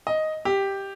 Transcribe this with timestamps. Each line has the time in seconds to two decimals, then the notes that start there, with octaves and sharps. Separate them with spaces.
0.07 D#5
0.45 G4